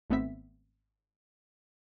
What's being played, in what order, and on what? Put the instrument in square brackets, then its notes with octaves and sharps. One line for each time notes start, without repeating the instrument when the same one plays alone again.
[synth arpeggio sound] G#1 A3 B3 C4 E5 B6